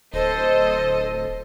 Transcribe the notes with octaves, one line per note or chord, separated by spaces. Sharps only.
D1 A4 C5 D#5